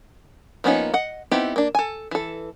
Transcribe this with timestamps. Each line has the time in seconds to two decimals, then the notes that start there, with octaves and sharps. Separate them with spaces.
0.64 F3 A#3 B3 C#4 D#4
0.94 D#5 F#5
1.31 B3 C4 D#4 E4 G4
1.56 A#3 D4
1.75 A4 G#5
2.11 E3 A4